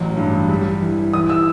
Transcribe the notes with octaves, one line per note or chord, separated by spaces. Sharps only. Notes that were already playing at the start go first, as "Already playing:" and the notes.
Already playing: A1 F#3
G2
G3
E3
E3 D#6
E6